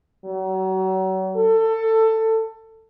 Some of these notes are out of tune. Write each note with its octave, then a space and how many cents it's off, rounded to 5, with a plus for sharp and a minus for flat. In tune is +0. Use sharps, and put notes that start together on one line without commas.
F#3 +35
A4 +20